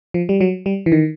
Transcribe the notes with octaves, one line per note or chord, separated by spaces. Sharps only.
F3
G3
F#3
G3
E3
D#3